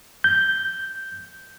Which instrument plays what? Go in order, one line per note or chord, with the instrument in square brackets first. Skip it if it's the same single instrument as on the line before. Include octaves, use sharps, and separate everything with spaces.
[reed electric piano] G6